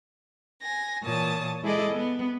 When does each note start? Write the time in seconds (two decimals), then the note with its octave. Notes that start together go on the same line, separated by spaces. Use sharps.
0.62 G#5 A#6
1.04 A#2 E3 C#5 A5 D#6
1.63 G#3 E4 G#4 A4 D5 D#5
1.92 B3